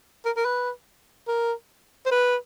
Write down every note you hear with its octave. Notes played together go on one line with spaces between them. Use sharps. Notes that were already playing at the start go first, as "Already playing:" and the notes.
A#4
A#4
B4
A#4
C5
B4